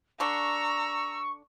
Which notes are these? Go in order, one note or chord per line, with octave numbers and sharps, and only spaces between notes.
D3 D4 A#5 C#6 E6